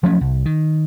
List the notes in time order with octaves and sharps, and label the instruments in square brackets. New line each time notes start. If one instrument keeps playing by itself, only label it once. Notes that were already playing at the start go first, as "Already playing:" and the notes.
[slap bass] F3 F#3 A3 C#4
C2
D#3